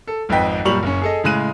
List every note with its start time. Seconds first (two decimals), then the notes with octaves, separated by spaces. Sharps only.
0.07 A4
0.29 G#1 F2 B4 D#5 G5 B6
0.65 F#2 A#2 G3 C#6 F7 F#7
0.83 F#1 C#4
1.02 G#4 A4 D#5
1.24 A2 C#3 G#3 F#6 D#7